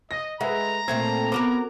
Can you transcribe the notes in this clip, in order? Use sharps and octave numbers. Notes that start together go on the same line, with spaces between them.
D#5 A#6
G#3 B4 E5 F#5 A#5
A#2 A3 C4 G#6
B3 C4 F#4 A#4 D6